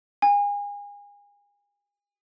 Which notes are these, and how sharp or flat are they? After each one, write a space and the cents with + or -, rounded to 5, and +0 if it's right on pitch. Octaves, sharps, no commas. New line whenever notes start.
G#5 -35